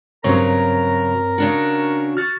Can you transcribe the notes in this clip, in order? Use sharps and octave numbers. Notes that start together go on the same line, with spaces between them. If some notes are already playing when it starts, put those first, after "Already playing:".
G2 C#3 F#3 C4 A#4 C#5 A#5
C#3 D4 F#4
F#4 F6 A6